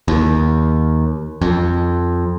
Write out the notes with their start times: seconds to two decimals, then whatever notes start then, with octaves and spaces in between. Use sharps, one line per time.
0.08 D#2
1.42 F2